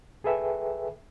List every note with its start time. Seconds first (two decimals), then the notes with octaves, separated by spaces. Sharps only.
0.24 C2 G#4 A4 B4 E5 G5